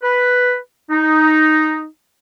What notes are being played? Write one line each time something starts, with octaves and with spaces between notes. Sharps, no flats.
B4
D#4